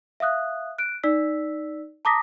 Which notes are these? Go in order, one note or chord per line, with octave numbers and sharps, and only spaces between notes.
E5 F5 D#6 F#6
F#6 D7
D#4 D5 E6 B6
A5 A#5 D6 D#6 A#6 B6